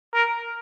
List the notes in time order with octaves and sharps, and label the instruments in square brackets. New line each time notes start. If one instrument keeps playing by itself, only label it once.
[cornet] A#4